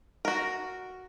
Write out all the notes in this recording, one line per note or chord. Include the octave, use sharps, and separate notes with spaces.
F#4 A#4